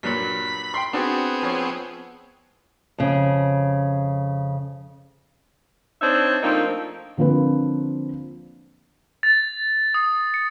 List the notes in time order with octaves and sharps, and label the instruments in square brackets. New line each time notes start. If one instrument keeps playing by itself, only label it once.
[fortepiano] G2 A#2 F#3 [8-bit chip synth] B5 B6
[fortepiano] G5 C6
[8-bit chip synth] B3 C4 G#4 [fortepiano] D4 F#4
[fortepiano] F3 C#5
[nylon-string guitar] F2 C#3
[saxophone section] C4 D4 D#4 C5 C#5 E5
F3 A3 A#3 C4 D4 D#4
[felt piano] D3 F3 A#3 C4 B4
[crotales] A6
D#6
C#7